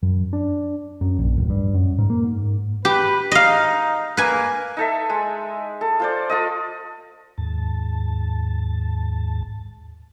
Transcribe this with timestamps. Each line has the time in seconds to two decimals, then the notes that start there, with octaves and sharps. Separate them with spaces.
0.02 F#2
0.33 D4
1.01 F#2
1.19 A#1
1.38 D1
1.50 G2
1.75 F#2
1.99 G#2
2.10 A#3
2.24 G#2
2.85 G4 B4
3.31 D#4 D#5 F5
4.17 A#3 B4 G#5
4.77 D#4 A4 E5
5.10 G#3
5.81 A4
6.00 F4 C5 D5
6.29 F4 A4 D#5
7.38 D#2 G#2 A5